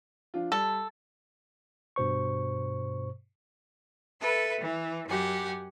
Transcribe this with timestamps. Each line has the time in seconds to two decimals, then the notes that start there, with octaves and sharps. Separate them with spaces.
0.34 F3 D4 F4
0.52 G3 A4
1.96 G2 B2 C5 C#6
4.21 A4 B4 E5
4.61 E3
5.09 F#2 G4 F#5 G#5